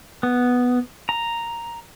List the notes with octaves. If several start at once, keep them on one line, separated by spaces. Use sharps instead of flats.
B3
A#5